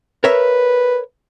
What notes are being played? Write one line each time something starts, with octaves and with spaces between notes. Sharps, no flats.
A#4 B4 C#5 E5